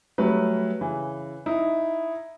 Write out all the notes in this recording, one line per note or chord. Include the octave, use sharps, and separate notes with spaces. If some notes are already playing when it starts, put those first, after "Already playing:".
F#3 G3 A3 B4
C#3 E3
D#4 E4